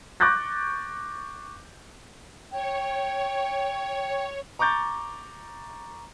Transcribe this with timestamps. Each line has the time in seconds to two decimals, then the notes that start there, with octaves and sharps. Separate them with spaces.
0.20 C#6 D6 F#6 G6 A6 A#6
2.52 C#5 G5
4.59 A#5 C#6 D6 G6 A6